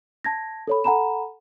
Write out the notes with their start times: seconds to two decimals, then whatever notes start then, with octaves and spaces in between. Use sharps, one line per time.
0.24 A5 G#6 A#6
0.67 A4 C#5 B5
0.84 A4 F#5 G#5 A#5 B5 E7